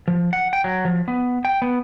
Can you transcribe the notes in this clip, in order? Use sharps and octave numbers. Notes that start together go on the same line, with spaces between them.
F3
F#5
G5
F#3
F3
B3
G5
B3